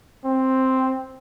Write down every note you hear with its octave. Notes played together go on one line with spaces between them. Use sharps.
C4